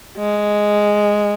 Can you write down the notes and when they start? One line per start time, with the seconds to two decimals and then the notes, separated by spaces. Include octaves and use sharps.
0.18 G#3